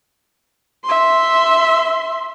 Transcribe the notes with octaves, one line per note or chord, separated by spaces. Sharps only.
E5 C6